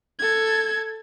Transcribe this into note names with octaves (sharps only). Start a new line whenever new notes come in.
A4 G#6